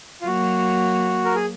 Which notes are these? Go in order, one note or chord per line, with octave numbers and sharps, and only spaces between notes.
F4
F#3 A#3 F#4
A#4
G#4